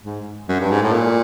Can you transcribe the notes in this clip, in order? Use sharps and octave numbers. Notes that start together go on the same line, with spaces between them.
G#2
F#2
G2
G#2
A2
A#2